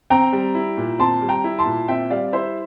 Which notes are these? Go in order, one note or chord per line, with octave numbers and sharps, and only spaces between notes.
C4 G5 A#5
G3
E4
A#2
C4 A5 C6
G3
G5 A#5
E4
A5 C6
A#2
C4 E5 G5
G3 D5 F5
E4 C5 E5